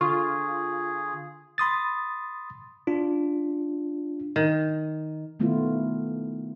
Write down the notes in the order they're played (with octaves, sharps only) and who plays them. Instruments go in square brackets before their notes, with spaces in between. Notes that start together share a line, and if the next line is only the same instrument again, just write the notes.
[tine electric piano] D3 [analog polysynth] F4 [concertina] G#4 [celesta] C#6
[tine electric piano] B5 C6 D#6 A6
D4 F4
[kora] D#3
[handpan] D#3 A3 B3 E4 F4